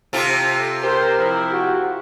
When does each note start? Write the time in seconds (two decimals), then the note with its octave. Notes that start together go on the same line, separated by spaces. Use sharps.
0.13 C3 F4 A4
0.83 G4 A#4 C5
1.19 F3 E4
1.53 F#4